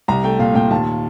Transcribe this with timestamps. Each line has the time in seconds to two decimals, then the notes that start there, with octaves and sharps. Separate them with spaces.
0.08 C2 A#5
0.24 A3 G5
0.39 A#2 F5
0.54 A#2 G5
0.70 D#2 A5